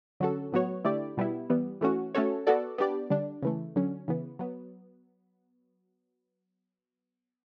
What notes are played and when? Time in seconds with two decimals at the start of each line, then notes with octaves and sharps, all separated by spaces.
0.20 D3 F#3 C#4 F#4 A4
0.52 A2 F#3 B3 F#4 C#5
0.85 D3 A3 E4 G4 D5
1.17 B2 G3 B3 E4
1.50 E3 G3 B3
1.81 E3 A3 C#4 F#4
2.15 A3 C#4 F#4 A4 C#5
2.47 B3 F#4 A4 D5
2.78 B3 D4 G4 D5
3.10 D3 G3 D4
3.42 C#3 E3 A3
3.76 D3 F#3 C#4
4.08 C#3 E3 B3
4.39 F#3 B3